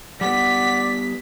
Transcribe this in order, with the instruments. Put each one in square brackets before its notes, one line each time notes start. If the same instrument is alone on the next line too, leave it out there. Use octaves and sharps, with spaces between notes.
[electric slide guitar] G3 B3 [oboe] D5 [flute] F#5 [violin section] B6